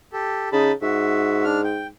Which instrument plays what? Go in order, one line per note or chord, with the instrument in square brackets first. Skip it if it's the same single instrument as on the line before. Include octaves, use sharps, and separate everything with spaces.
[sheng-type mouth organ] G4 A4
[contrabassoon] C#3 [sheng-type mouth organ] D#4 A5 B5
[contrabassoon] G#2 [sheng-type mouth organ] F#4 E5
[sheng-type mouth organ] D4 F6
G5